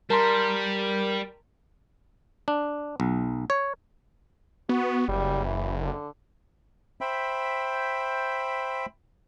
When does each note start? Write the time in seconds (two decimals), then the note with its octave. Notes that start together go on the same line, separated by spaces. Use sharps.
0.10 G3 A#4 A5 A#5 C6
2.48 D4
3.00 B1
3.50 C#5
4.69 B3 F#4
5.08 F#1 G3
5.45 E3
5.82 D3
7.01 C5 E5 G5 B5